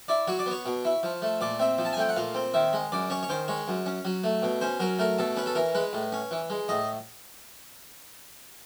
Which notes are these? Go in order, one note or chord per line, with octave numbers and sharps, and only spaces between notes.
E4 D5
F#3 C#5
D5
B3
C#5
B2
E4
F3
A3
A#2 D5
C4 E5
F3
A5
G#5
A3 G5
F#5
A#2 F5
C4
D#3 E5
G#3
F#2 D5
C#4 C#5
C#5
D#3 C5
G#3 C#5
F#2
C#4
F#3
A3
B2
C#4 C5
F#3 A#4
A3 A#4
B2 A4
C#4 B4
A4
E3 A#4
G#3 B4
A2
C#4
E3
G#3
A2 D#5